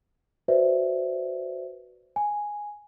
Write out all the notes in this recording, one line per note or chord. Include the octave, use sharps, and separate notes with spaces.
F#4 B4 C5 D5 E5
G#5